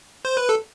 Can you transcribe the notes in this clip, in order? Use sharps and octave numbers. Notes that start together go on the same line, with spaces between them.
C5
B4
A4